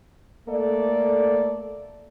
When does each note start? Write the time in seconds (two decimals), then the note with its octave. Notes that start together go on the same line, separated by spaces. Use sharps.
0.49 A3 A#3 A4 D5